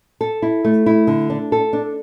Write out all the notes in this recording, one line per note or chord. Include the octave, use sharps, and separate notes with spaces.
A4
E4
A3
E4
D3
D4
A4
D4